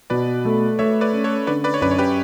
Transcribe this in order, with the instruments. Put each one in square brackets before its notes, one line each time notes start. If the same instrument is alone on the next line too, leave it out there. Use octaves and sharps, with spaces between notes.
[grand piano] B2 [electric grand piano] B4 D5
[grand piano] A3
[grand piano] A3 [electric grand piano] C#5 E5
[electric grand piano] B4 D5
[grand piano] C#4
[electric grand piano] A4 C#5
[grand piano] D3 [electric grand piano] B4 D5
[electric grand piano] B4 D5
C#5
[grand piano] F#2 [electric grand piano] B4 D5
[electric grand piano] C#5
G4 B4